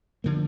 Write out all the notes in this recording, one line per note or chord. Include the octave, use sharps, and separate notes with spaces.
D3 F3 A#3